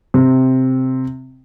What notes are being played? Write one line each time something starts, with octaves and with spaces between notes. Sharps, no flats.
C3